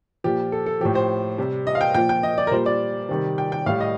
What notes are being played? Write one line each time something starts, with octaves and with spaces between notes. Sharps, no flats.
A#2 F3 G4
A4
A4
A2 F3 G4
C5
C3 G3
D#5
F5
G5
A#2 F3 G5
G5
D#5
D5
A#4
A#2 G3 C5
D5
C3 D#3 G3
G5
G5
A2 G3 F5
D#5